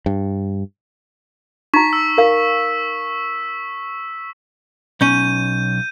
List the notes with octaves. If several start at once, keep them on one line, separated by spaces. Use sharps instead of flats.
G2
D#4 A#5 C#6 B6
E6
A#4 F5
B1 C#4 G6 D#7